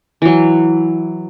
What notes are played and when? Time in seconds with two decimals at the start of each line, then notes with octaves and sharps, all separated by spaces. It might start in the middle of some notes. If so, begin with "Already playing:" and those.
0.22 E3 F#3